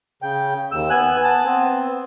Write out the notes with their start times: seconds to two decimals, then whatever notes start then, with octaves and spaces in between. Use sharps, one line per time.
0.22 C#3 G5
0.71 D#2 E6
0.90 B3 G#5 F#6
1.24 B3 A5
1.45 B3 C4